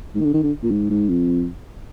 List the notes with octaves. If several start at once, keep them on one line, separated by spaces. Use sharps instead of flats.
G#2
D#3
D3
D#3
D3
A#2
G#2
G#2
F2